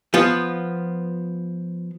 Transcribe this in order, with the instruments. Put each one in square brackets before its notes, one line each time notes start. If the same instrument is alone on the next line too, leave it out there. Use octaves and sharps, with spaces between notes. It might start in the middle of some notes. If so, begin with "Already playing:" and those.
[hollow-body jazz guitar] F3 B3 F4